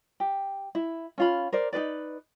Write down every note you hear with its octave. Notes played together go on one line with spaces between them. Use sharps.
G4
E4
C#4 F4 B5
A#4 C5 D5
D#4 G#4 B4 D5